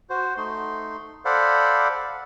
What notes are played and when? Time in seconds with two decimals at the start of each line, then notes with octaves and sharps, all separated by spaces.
0.10 F#4 C5
0.37 A3 D#4 C6
1.25 A4 C5 D5 F5 F#5 B5